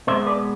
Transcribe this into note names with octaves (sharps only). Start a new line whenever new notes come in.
B2 G#3 B3 C5 E5
B4 D5